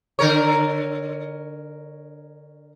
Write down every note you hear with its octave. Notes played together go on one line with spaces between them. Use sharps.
D3 A#4 C#5